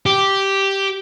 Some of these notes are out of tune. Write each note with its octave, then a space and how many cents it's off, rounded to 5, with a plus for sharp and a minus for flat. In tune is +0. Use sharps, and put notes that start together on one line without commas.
G4 -5